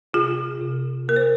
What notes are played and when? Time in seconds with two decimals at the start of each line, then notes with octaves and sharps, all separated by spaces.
0.14 C3 F4 G#4
0.61 C3
1.08 A#3 A#4
1.16 C5